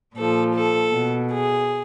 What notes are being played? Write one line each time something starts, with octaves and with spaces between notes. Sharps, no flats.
A#2 F3 A4
A4
B2
G#4